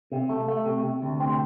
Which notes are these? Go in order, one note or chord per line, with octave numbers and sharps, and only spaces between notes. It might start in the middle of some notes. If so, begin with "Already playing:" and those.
C3
A3
A3
C3
C3
D2
C4